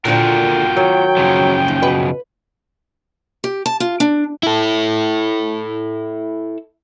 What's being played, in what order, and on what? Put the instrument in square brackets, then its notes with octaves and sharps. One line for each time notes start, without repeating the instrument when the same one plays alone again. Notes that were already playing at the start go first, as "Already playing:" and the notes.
[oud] A#2 D3 F3 [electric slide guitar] F4 F#4 A#4 [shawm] G5
[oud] D#3 [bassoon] F#3
[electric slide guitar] F#2 C#3 F3
[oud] D#2
[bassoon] B2 [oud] B4
[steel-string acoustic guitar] G4
A5
F4
D4
[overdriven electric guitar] E4 A4